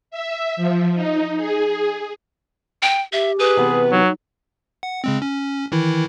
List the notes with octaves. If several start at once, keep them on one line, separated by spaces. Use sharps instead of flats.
E5
F3
D#4
G#4
G5
G4 E5
G#4 B4
C3 E3 B3
F#3 D#4
F#5
C#3 G#3 C4
C#4
D#3 E3 E4